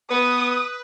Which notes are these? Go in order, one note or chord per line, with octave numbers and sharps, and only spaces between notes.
B3 B4 D#6